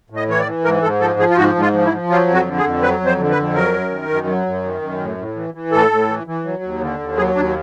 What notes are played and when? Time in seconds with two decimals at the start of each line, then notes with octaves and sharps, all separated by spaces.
0.10 A2
0.16 D#5
0.28 E3 C#5
0.40 D5
0.46 E3
0.64 G#2 A#4
0.82 G#2 A4
1.00 F3 A4
1.19 F3 G#4
1.30 F4
1.37 G#2 F#4
1.55 G#2
1.61 F4
1.73 F3
1.85 E4
1.92 F3
2.10 F#3 F4
2.28 F2
2.34 F#4
2.46 D3
2.58 G#4
2.64 F2
2.82 F#3 B4
3.00 F2
3.06 C5
3.18 D3
3.31 B4
3.37 F2
3.54 F#3 A#4
3.73 F#2
3.91 D#3
4.09 F#2
4.27 F#3
4.46 F#2
4.64 D#3
4.82 F#2
5.00 A2
5.18 A2
5.36 E3
5.54 E3
5.72 A2 A4
5.91 A2
6.08 E3
6.27 E3
6.45 F#3
6.63 D#2
6.81 D3
7.00 D#2
7.17 F#3 G#4
7.35 D#2 D4